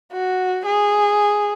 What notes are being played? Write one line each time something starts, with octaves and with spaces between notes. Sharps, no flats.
F#4
G#4